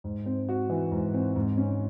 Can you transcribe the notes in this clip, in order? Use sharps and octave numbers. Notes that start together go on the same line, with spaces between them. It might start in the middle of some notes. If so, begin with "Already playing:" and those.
G#2
C4
F#4
E3
G#2
C4
G#2
C#4